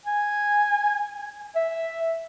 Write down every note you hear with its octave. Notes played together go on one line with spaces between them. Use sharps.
G#5
E5